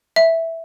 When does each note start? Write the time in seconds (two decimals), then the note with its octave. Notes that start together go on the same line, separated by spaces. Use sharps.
0.16 E5